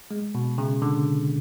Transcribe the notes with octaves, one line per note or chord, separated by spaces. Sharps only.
G#3
B2
C#3
D3